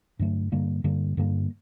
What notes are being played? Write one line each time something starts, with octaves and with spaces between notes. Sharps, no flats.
G2 D3 F#3 A3
G2 D3 G3 A#3
G2 D3 G3 A#3
G2 D3 G3 A#3